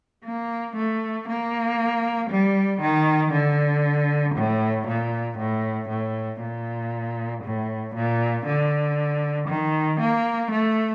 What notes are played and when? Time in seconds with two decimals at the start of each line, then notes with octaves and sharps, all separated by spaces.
0.25 A#3
0.76 A3
1.28 A#3
2.31 G3
2.81 D#3
3.33 D3
4.35 A2
4.88 A#2
5.38 A2
5.89 A2
6.41 A#2
7.43 A2
7.95 A#2
8.46 D3
9.49 D#3
10.00 A#3
10.52 A3